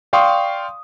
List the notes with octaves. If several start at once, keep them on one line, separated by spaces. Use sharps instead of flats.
D5 F5 G5 C6 C#6 D#6